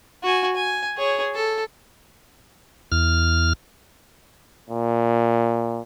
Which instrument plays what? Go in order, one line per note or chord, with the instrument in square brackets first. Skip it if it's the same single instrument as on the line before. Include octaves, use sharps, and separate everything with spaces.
[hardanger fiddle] F#4 G#5
G#5
G#4 C#5
A4
[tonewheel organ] E2 F6
[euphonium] A#2